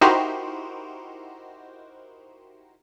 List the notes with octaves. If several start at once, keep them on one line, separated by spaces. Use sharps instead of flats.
D#4 E4 F#4 G4 A#4 C5